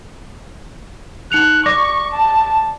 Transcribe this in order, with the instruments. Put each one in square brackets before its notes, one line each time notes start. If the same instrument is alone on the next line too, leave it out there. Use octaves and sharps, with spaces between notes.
[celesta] D#4 C#7 F7 [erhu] F#6
[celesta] D5 D6 A#6 [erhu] C#6
[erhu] A5